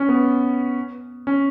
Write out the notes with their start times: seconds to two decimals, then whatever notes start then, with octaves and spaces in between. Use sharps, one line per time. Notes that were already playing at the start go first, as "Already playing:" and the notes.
Already playing: C#4
0.09 B3
1.27 C#4